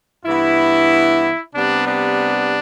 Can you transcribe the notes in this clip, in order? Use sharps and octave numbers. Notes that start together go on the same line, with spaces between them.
G2 E3 B3 E4
C3 G3 B3 D4
D4